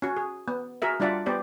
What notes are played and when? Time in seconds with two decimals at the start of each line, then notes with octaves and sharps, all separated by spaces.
0.02 C#4 F#4
0.17 G#4
0.48 B3
0.82 F#4 G#4 A#4 E5
1.00 G3 D4 F4 D5 E5 F#5
1.26 B3 G4 C5 D5